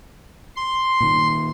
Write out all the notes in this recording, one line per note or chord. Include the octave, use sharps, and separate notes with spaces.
C6
A#2 D#3